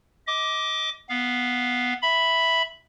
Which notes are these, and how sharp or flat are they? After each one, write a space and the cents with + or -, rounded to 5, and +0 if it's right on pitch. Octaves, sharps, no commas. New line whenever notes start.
D#5 +30 D6 +0
B3 +0 F5 +0
E5 +0 B5 +0